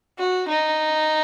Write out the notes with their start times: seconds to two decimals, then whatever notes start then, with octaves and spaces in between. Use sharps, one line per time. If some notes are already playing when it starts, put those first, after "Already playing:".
0.18 F#4
0.48 D#4